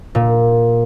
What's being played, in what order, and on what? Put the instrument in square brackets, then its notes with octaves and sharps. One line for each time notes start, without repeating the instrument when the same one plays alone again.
[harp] A#2